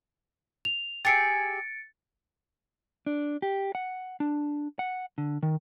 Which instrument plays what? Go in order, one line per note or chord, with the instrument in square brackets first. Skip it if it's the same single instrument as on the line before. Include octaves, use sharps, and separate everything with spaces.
[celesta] F7
[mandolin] G4 G#4 E5 [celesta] A6 C#7 D7
[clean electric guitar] D4
G4
F#5
D4
F#5
D3
D#3